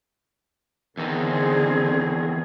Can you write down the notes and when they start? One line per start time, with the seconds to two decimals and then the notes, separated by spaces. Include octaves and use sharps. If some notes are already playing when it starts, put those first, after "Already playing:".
0.97 E2 D3 D#3 C4 G#4